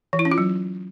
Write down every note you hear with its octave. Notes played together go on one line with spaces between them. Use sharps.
E3
E4
C#4
F4
F#3